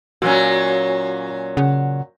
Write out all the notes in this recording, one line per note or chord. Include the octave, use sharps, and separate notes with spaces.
A#2 F#3 C#4 F#4 C#5
C#3 F#5